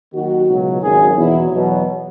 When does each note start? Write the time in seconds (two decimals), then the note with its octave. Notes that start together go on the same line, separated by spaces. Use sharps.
0.13 D#2 D#3 F#3 F#4
0.48 C#2 B2 F#3
0.82 G#1 F#2 D#3 F#3 G#4
1.16 E2 B2 F#3 E4
1.51 E2 B2 F#3